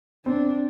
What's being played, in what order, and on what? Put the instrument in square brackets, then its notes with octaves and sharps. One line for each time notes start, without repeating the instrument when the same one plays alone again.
[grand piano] C4 [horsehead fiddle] D4